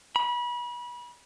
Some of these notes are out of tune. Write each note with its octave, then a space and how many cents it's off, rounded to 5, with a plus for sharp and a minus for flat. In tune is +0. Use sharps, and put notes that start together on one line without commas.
B5 -30